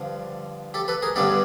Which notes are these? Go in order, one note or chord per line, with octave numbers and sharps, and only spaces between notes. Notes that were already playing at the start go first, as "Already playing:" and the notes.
Already playing: G2 D3 F3
G4 A4
A4 B4
G#4 A#4
G2 D3 G3 B3 D4 G4 A4